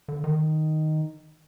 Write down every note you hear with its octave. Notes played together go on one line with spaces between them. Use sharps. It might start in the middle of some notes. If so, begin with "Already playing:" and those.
D3
D#3